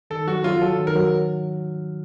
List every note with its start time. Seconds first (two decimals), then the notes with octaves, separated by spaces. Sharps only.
0.10 D#3 A4
0.28 F#3 F#4
0.44 F#3 F4
0.62 F#3 A4
0.79 D#3
0.87 A#4
0.95 F#3